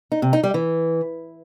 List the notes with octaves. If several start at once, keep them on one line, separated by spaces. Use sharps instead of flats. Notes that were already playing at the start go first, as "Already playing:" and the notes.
D#4
C3
D#4
G3
E3